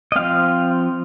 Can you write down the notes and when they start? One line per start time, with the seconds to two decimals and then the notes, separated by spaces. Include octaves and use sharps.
0.12 D#5
0.16 F3 C4 F5